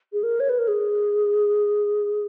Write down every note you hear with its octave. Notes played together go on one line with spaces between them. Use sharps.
G#4
A#4
C#5
B4
A#4
G#4